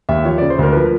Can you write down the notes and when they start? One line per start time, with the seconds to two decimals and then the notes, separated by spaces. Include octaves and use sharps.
0.09 D#2 E5
0.25 F3 C#5
0.38 C#3 D5
0.50 C5
0.59 D2 A#4
0.72 F3 B4
0.83 A#4